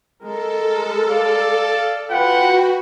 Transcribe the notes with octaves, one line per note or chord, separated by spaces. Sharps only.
G#3 A4 A#4
D5 F5
F4 F#4 B4 F#5 G5